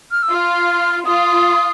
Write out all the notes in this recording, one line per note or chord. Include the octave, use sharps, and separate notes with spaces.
F6
E6
F4 F6
F4 D#6